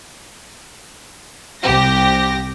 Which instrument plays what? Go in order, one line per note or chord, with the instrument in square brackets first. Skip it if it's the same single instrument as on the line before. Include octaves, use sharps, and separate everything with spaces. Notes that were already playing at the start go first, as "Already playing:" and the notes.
[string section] C2 G4 A#6